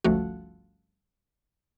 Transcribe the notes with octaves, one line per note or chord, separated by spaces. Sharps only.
G1 C#2 F3 A3 F#4